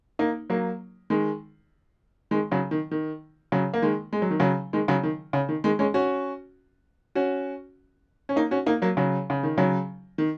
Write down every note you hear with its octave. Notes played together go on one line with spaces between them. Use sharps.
A#3 D#4
F#3 A#3
D#3 G#3
D#3 G#3
C#3 F#3
D#3
D#3
C#3 F#3
A#3
D#3 G#3
G#3
F#3
D#3
C#3 F#3
D#3 G#3
C#3 F#3
D#3
C#3
D#3
D#3 G#3
G#3 C#4
C#4 F#4
C#4 F#4
C#4
A#3 D#4
C#4 F#4
A#3 D#4
F#3 A#3
C#3 F#3
C#3
D#3
C#3 F#3
D#3